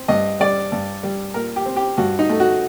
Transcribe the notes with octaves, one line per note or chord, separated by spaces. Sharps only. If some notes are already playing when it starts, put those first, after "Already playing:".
Already playing: C4
G2 D#5
G3 D5
G2
G3
A#2 A#4
G4
C4
G4
G2 F#4
D#4
A3
F#4